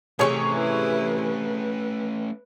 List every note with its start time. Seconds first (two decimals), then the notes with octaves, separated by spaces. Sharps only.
0.19 C3 D#3 E3 A3 C#4 G#4 C#5 C#6
0.53 E4 B4
1.23 B4